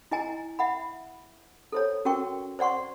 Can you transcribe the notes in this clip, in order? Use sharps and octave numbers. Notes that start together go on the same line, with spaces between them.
E4 D#5 G#5 A#5
E5 F#5 B5
A4 C5 C#5
C#4 F#4 A#4 G5 C#6
C5 D5 F#5 C6 C#6